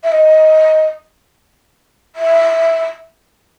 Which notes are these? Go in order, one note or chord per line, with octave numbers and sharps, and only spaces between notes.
E5
D#5
E5